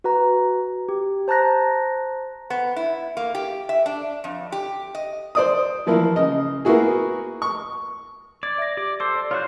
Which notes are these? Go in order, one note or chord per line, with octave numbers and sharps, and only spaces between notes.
F#4 B4 A#5
G4
C5 A5 A#5 F#6 A#6
B3
E4
A#3
G4
E5
D4
F2
G4
D#5
C5 D5 D#6
E3 F3 A#3 E4
C#3 D#5
A#3 B3 E4 F#4 G#4
C#6
D5 G#6 A6
E5 A#6
G4 D5
A4 C5 D6
D5
F4 F#4 C5 C#5 F#6